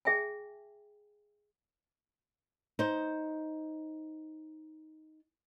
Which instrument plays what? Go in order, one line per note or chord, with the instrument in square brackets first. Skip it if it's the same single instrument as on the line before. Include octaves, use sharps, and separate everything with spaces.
[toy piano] G#4 E5 G5 G#5
[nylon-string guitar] D#4 C5